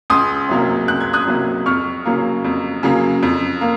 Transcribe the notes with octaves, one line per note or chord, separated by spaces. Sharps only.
C#2 C6 D#6
C3 F#3 A#3
C#2 F#6
G#6
D#6 F#6
C3 F#3 A#3
F2 C#6 F6
C#3 F#3 A#3
F2
C#3 F#3 A#3
F2
A#3